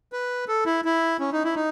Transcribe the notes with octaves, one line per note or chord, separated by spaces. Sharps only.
B4
A4
E4
E4
C#4
D#4
E4
D#4